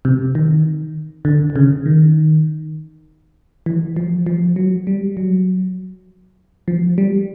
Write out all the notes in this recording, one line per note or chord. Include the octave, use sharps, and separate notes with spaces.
C3
D#3
D3
D3
C#3
D#3
E3
F3
F3
F#3
G3
F#3
F3
G3